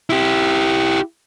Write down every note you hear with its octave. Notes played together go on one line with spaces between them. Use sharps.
E4 G4